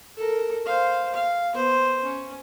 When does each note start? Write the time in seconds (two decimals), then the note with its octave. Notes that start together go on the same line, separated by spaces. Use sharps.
0.17 A4 A#4
0.66 C5 F5
1.14 F5
1.54 B3 C5
2.03 C#4